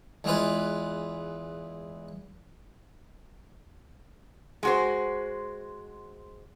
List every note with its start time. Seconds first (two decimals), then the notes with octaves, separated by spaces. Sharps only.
0.24 E2 G#3 F4 B4
4.63 G#3 F#4 C5